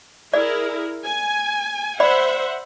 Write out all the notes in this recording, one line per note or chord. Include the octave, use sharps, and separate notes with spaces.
E4 G#4 A#4 D5
G#5
C5 D5 E5 F#5 B5